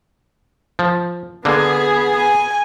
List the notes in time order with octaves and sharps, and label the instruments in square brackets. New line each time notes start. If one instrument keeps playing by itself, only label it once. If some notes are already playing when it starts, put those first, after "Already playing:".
[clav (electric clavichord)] F3
[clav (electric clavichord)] D3 A#3 [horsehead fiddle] B3 G#4
[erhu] G#5